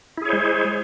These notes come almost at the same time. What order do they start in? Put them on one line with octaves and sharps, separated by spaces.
E4 G#4 C#5 C5 G#3